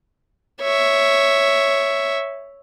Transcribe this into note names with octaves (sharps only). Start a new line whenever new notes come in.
C#5 E5